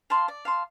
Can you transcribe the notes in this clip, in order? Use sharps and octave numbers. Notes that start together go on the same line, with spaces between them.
F5 A5 C6
D5
F5 A5 C6